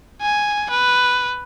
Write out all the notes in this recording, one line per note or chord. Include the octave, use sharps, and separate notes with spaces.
G#5
B4